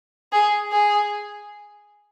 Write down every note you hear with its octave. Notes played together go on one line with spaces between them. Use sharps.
G#4
G#4